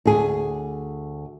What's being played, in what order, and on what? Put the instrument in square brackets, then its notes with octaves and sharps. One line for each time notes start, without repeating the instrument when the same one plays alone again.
[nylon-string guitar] D2 G#4